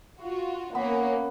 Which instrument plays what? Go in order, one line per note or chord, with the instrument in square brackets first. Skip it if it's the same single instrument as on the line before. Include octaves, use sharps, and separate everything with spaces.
[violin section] F4 F#4
[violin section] A#3 C#4 [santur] B3 B5